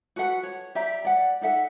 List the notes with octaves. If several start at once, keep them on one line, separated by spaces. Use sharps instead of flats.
F#4 A4 B4 F#5
C#5
G4 D5 E5 A#5
D5 F#5
D#4 A4 E5 F#5